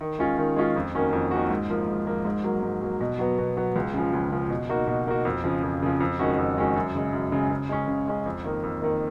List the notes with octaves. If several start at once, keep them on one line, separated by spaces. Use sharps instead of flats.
D#3
G#3 C#4 F4
D#3
G#3 C#4 F4
F2
D#3 A#3 C#4 F#4
F2
D#3 A#3 C#4 F#4
G#2
F3 A#3
G#2
F3 A#3
G#2
F#3 A#3
G#2
F#3 A#3
B2
F#3 B3
B2
F#3 B3
C#2
C#3 F3
C#2
C#3 F3
B2
A#3 D#4 F#4
B2
A#3 D#4 F#4
F2
C#3 F3
F2
C#3 F3
F2
D#3 G#3 C#4 F#4
F2
D#3 G#3 C#4 F#4
F#2
C#3 G#3
F#2
C#3 G#3
C#3
G#3 C#4
C#3
G#3 C#4
F2
D#3 A#3
F2
D#3 A#3